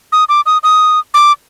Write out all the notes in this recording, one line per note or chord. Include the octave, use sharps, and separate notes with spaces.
D#6
D6
D#6
D#6
D6